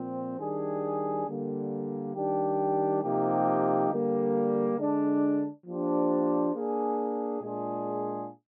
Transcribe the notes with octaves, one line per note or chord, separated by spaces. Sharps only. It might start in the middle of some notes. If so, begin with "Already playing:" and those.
Already playing: A#2 F3 C4
D#3 G3 D4 G#4
D3 G3 A#3
D#3 G3 D4 G4
C3 F3 A#3 D#4 G4
D3 G3 A#3
D3 G#3 D4
F3 A#3 D4 G4 C5
A#3 D4 G#4
A#2 G#3 D4 F4 G#4